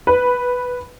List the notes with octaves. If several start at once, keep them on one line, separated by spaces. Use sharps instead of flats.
B4